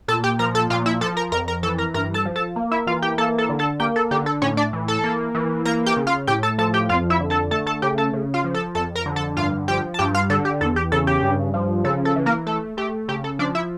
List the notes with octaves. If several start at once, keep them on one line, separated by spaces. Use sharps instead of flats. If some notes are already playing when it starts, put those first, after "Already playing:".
A#2 A4 A5
G4 G5
F3 A#4 A#5
A4 A5
A#2 F4 F5
E4 E5
F3 A4 A5
A#4 A#5
F2 A#4 A#5
A#4 A#5
E3 A4 A5
A#4 A#5
G2 A#4 A#5
A4 A5
F3
A4 A5
A#3
E4 E5
E3 F4 F5
G4 G5
A#3 A4 A5
A4 A5
D3
A4 A5
A#3 G4 G5
A4
D3 G4
A4
A2 C#4 C#5
D4 D5
E3
A4 A5
A#3
E3
A#3 A#4 A#5
G4 G5
C#3
F4 F5
A2 G4 G5
A4 A5
F3 A4 A5
G4 G5
F2 F4 F5
E4 E5
D3
A4 A5
A3 A4 A5
A4 A5
C#3 G4 G5
A4 A5
C#3
F4 F5
F3
A4 A5
F2 A4 A5
A#4 A#5
D3
A4 A5
G2 F4 F5
F3 G4 G5
A5
G2 G4 G5
F4 F5
D3 A4
G4
E2 A4
G4
C#3 A4
G4
G2
F3
C#3 A4
A4
E3
A#3 A#4
A3 A4
A3 G4
C#3 G4
A4
F3 D4 D5
E4 E5